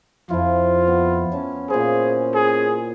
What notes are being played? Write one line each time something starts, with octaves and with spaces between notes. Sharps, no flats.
F2 F3 E4 F4
B3
C#4 A5
A#2 G#4 C5
G#4